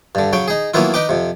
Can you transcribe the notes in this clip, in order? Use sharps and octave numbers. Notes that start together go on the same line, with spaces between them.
G2 D3
C#3 F#3 G5
D#4 G#4
E3 F#3 A#3 B3 E4 F4
D#4 B4 G5 D6
F2 C3